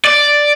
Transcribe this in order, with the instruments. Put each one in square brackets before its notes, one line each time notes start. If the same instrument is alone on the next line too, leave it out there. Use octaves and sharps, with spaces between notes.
[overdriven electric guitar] D5